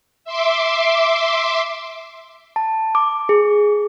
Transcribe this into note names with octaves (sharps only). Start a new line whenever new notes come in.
E5 C6 D6
A5
D6
G#4